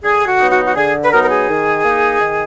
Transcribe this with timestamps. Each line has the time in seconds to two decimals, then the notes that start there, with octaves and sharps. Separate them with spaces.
0.03 D3 G#4
0.27 F#4
0.39 F#3 B3 D#4
0.51 F#4
0.65 F#4
0.76 D3 G#4
1.03 B4
1.11 F#3 B3 D#4 A#4
1.23 A#4
1.30 G#4
1.47 D#3
1.83 A#3 D#4
2.20 D#3